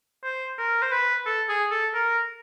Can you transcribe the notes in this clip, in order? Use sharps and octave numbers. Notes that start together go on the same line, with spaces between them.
C5
A#4
C5
B4
A4
G#4
A4
A#4